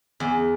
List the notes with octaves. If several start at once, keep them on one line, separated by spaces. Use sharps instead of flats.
E2